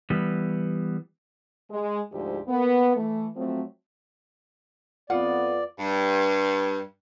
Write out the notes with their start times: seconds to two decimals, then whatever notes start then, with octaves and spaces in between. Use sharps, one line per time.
0.10 E3 G3 B3
1.71 G#3
2.13 D2 G#2 F3 G#3 G4
2.48 A#3 B3
2.96 E3 A3
3.36 F3 F#3 A3 C4
5.10 F2 B3 F4 D5 F#5
5.79 G2